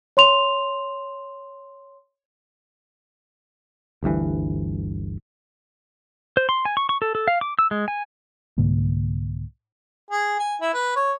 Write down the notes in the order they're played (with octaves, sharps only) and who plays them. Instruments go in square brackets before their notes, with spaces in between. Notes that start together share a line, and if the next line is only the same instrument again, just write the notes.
[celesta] C#5 C6 F7
[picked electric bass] G1 D2 G2 E3
[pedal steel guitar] C5
C6
G#5
C#6
C#6
A4
A4
F5
D6
E6
G#3
G#5
[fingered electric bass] C2 G#2 D3 A#3
[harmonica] G#4
G#5
E4
B4
C#5